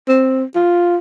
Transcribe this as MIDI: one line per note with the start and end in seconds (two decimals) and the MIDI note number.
0.08 0.44 60
0.55 0.98 65